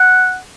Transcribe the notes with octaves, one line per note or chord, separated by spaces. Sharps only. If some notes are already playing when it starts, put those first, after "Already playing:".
Already playing: F#5